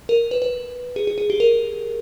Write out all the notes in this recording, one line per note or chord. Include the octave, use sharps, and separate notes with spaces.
A#4
B4
B4
G#4
G#4
G#4
G4
A#4